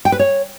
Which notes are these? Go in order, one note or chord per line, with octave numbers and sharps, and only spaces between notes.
G5
B4
C#5